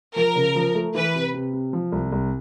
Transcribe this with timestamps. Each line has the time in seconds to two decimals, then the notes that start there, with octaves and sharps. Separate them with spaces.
0.16 F3 A#4
0.36 C#3
0.55 F3
0.74 A3
0.95 E3 B4
1.15 C3
1.34 C3
1.53 C3
1.73 F3
1.92 C2
2.12 C2